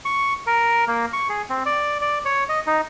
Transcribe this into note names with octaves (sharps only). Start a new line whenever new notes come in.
C#6
A#4
A#3
C#6
G#4
C4
D5
D5
C#5
D#5
D#4